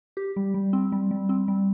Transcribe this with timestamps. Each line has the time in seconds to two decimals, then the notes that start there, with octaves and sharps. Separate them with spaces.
0.17 G4
0.36 G3
0.54 G3
0.73 C4
0.92 G3
1.11 G3
1.29 C4
1.48 G3